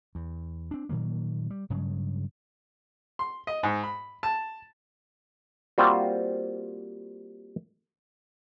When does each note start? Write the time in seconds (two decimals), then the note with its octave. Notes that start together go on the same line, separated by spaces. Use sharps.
0.15 E2
0.71 C4 D4
0.89 A#2 D#3 F#3 A#3
1.50 G3
1.70 G2 C#3 F#3 G#3
3.19 C6
3.47 D#5
3.63 G#2
3.83 B5
4.23 A5
5.78 G3 A#3 C4 F4 F#4 C5